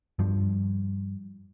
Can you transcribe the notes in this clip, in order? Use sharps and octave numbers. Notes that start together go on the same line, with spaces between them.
G2 F3